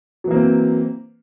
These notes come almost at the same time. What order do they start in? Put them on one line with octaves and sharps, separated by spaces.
F#3 E3 A#3 C4